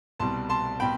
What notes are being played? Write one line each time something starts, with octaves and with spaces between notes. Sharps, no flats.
C2 B2 G3 A5 C6
A5 C6
B2 G5 B5